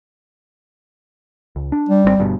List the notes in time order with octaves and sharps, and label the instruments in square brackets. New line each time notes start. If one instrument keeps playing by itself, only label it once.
[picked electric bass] C#2
D4
[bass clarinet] G3
[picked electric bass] G#1 D#3 C4
G1 G2 B2